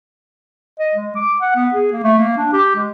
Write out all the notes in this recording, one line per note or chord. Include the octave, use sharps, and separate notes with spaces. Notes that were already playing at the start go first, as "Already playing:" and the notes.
D#5
G#3
D6
F#5
B3
G#4
A#3
A3
A#3
D4
G4
G#3